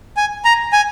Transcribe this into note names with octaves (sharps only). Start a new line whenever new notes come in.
G#5
A#5
G#5